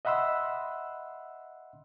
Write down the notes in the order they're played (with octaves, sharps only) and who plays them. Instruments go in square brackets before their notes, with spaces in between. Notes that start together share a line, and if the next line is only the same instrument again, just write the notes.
[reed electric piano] D#5 E5 F#5 B5 C6 E6